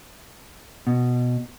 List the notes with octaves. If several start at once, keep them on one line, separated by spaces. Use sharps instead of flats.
B2